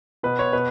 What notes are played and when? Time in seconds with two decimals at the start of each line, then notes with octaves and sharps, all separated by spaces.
0.23 B2 B4
0.39 C#5
0.53 B2 B4